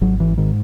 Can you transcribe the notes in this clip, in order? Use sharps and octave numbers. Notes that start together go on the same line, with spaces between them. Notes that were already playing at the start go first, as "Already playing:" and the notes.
G#1 F#3
E3
G#2 D#3